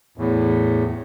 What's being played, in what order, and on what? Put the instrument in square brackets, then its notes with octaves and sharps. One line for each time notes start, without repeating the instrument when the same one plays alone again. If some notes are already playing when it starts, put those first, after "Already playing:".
[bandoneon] E2 A2